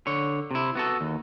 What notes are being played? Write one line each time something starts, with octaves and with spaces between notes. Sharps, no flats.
D3 C#5
C3 E4
B3 F#4 A4
D#2